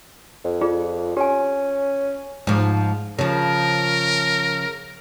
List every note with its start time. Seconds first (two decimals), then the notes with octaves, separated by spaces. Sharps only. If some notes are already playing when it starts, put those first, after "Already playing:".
0.45 F2
0.61 F4 G#4 D5
1.17 C#4 G4 G#5
2.47 G#2 F3
3.19 C#3 F3 A#4